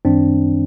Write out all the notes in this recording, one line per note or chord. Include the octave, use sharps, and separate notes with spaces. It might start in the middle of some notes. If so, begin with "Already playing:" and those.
F#2 D#3 G3 C4 D4